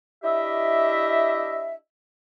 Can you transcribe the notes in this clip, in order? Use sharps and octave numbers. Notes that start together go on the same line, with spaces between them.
D4 E4 G4 D#5 E5